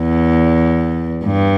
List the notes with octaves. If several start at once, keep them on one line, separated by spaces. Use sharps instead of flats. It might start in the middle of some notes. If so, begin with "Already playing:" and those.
Already playing: E2
G2